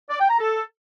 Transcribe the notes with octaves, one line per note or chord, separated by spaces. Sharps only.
D5
G5
A#5
A4